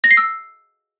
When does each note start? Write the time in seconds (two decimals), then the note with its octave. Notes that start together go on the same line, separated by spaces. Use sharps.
0.04 A#6
0.11 C7
0.17 E6